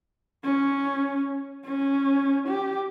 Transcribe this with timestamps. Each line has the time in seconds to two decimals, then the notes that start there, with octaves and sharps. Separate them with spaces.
0.44 C#4
1.65 C#4
2.48 G4